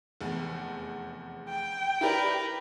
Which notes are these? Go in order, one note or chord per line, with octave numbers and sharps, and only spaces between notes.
F1 E2
G5
E4 G4 A#4 B4 D5